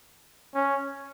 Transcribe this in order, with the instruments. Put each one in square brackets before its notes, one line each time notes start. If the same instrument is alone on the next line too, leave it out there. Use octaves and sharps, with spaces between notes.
[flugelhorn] C#4